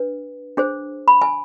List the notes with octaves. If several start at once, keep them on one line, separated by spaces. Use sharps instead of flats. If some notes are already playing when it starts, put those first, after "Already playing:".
Already playing: D4 B4
D4 G#4 C5
B5
G#5